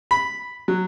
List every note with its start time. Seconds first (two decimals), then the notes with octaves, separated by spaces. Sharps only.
0.11 B5
0.68 F#3